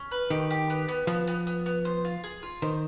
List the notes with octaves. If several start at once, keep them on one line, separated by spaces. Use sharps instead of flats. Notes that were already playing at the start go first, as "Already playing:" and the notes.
Already playing: C#4
B4
D#3 G4
G4
B3
B3
F3 B3
B3
B3
B3
C5
F4
G#4
F4
D#3 C5